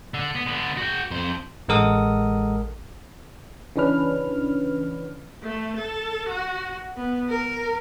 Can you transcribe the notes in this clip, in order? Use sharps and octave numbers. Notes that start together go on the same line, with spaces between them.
D3
B3
D3 B3
F#4 G5
F2 C5
A1 G#3 A4 A#4 F#5 D#6
C#3 E3 C#4 D4 B4 F6
A3
A4
F#4
B3
A#4